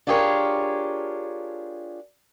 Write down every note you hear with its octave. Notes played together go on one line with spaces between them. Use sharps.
D4 F4 G4 G#4 A#4 C#5